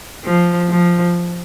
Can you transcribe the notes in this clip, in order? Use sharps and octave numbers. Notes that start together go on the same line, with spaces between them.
F3
F3